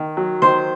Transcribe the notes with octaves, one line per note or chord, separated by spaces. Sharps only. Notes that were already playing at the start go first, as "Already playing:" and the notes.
Already playing: D#3
F#3
D#3 C5 C6